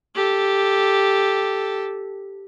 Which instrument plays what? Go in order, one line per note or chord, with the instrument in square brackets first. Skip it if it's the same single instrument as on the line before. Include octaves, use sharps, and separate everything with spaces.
[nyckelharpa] G4 A4